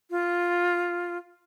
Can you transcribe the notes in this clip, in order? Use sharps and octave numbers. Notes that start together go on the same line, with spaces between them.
F4